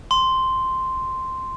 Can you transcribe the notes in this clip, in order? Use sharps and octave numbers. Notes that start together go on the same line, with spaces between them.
C6